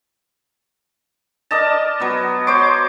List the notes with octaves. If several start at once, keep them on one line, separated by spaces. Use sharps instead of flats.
A#4 D5 D#5 A5
F#3 B3
C5 C#5 C6 D6